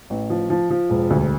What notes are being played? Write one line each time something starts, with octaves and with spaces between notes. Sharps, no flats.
A1
F3
F3
F3
E1
D2